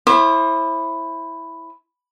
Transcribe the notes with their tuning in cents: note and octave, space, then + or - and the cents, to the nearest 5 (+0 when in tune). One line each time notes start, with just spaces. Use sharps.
E4 +0 C5 +35 D6 +45